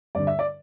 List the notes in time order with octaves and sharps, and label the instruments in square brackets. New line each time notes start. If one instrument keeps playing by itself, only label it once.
[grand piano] G2 D3 D5
E5
D5